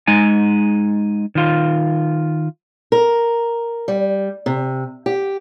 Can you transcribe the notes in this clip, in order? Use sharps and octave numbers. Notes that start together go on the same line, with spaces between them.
G#3 D#4 G#5
D#3 F4
A#4
G3
C3
G4